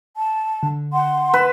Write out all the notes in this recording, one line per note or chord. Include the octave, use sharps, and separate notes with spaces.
A5
D3
F#5 C6
B4 E7